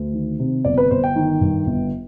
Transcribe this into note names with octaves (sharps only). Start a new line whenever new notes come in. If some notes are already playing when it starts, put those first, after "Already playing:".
Already playing: D2
D#3
C3
G1 D5
B4
G1 C5
G5
D#3
G2
G1